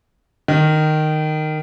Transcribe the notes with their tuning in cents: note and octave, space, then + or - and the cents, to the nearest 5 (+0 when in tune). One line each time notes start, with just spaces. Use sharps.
D#3 -10